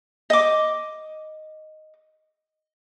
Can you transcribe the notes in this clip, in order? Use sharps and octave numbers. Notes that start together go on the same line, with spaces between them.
D#5 D6